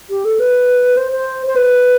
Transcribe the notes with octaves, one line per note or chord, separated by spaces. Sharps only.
G4
A4
B4
C5
C5
C5
B4